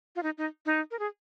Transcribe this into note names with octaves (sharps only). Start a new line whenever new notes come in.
F4
D#4
D#4
D#4
A#4
G#4